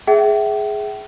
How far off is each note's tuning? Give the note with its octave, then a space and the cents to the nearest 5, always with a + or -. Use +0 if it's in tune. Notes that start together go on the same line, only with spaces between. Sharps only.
G#4 +10 E5 +0 G5 -40